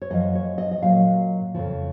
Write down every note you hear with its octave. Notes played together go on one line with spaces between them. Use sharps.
C#5
F#2 F3 D#5
C#5
D#5
D#5
A#2 F#3 F5
F2 C#3 F3